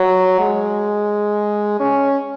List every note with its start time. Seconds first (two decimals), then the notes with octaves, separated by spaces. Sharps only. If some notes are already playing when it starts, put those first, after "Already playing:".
Already playing: F#3
0.40 G#3
1.80 C#4